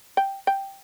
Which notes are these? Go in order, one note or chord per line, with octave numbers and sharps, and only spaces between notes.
G5
G5